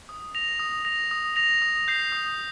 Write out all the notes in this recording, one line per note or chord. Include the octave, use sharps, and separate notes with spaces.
D#6
A#6 F7
D#6
A#6 F7
D#6
A#6 F7
D#6
G6 C7
D#6